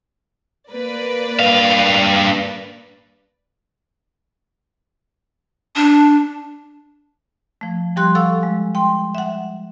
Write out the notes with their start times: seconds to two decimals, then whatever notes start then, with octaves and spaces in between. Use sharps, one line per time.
0.71 A#3 B4 D5
1.39 G2 F5
5.76 D4
7.61 F3 A3
7.96 F3 G3 G4 C6 F#6
8.15 A4 F5 F#5 C#6 E6
8.43 G#3
8.75 G5 C6
9.15 E5 F#5